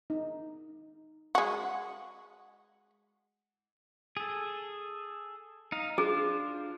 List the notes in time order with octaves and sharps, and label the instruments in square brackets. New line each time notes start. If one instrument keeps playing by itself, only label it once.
[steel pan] D#4
[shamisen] G#3 F#4
[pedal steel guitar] G#4 A4
D#4 F5
[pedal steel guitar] D4 F4 C5 [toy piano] G#4